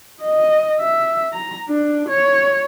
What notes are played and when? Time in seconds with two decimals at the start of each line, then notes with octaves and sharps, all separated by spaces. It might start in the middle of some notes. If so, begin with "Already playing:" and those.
0.22 D#5
0.80 E5
1.33 A#5
1.68 D4
2.08 C#5